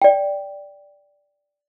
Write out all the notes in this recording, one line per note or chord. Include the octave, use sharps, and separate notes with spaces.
D5 G5